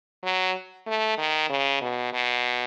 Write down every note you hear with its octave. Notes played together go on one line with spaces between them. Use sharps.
F#3
A3
D#3
C#3
B2
B2